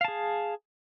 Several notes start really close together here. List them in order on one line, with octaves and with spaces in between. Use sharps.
F5 A5 G#4